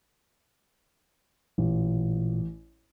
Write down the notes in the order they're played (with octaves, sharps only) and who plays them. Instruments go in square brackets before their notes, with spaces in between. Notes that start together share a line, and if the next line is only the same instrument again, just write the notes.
[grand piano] A1 [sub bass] A#2